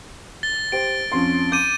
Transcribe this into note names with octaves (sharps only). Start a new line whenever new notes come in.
A6 G7
G4 C5 D7
F2 C#4 C6
D6 G6 D#7